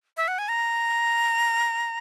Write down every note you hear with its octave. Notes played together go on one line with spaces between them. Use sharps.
E5
F#5
G#5
A#5